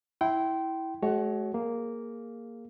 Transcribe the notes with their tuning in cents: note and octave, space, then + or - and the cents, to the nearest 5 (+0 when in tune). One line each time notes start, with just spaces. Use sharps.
E4 -10 G5 -20 C6 +0
G#3 +45 F#4 +25 C#5 +0
A#3 +0 G#4 +0